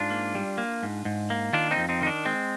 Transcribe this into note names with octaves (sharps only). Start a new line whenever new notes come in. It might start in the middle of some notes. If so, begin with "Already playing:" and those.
Already playing: G#2 D4 F4
A#3
G3
A#3
G#2
G#2
A#3
D#3 D4 F4
C4 D#4
F2
C4 D#4
D#3 D#4
D4
G#3 C4